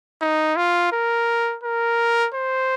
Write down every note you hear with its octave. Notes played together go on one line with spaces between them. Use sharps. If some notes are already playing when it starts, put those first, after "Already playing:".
D#4
F4
A#4
A#4
C5